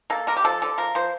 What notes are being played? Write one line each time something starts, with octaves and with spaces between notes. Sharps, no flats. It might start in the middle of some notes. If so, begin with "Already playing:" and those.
A#3 A4
D3 A#4
G4
F3 A4
D3 A4
F3 A#4
F3 C5